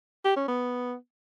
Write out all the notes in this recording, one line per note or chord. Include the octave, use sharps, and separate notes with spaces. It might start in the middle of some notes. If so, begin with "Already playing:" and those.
G4
C#4
B3